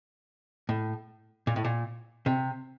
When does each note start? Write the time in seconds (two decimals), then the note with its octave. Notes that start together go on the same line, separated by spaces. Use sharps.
0.69 A2
1.47 A#2
1.56 A2
1.65 A#2
2.26 C3